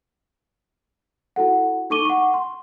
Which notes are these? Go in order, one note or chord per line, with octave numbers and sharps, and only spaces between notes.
E4 F#4 A4 F#5
D#4 A4 C#6 D6 D#7 G7
F#5 C#6
C6